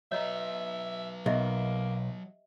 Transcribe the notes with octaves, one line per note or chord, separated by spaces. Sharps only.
F#3 B4 C#5 D#5 E5 A#5
B1 A#3 G4 D#5 E5